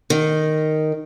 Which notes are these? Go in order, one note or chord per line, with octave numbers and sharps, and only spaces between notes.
D#3